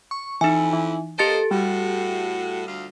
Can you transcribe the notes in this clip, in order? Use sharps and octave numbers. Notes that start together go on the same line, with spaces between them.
C#6
F2 E3 D#4 E4 G#5
E3
A#3 G4 A4 C5 D#5 A6 D7
A2 G3 F#4
D2 F4